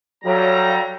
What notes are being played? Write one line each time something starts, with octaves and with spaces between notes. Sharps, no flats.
F#3 G3 A4 C#5 F5 A#5